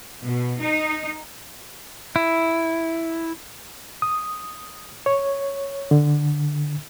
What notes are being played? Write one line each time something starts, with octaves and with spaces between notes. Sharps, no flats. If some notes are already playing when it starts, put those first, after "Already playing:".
B2
D#4
E4
D#6
C#5
D3